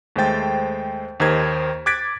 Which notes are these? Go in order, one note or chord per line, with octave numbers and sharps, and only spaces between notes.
D#2 G#3 A3 C5 G5 A6
D#2 D#3 G4 A#4 C5 G#6
D6 F#6 G#6 A6 B6 D7